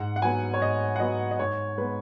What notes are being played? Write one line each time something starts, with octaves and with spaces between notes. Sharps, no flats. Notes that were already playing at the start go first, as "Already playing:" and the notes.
Already playing: G#2 F#5
F#5
F#3 B3 G#5
C#5
G#2 D#5
F#5
F#3 B3 D#5
D#5
G#2 C#5
G#3 B3 B4